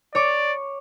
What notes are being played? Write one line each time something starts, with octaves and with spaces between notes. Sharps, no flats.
C#5 D5 D6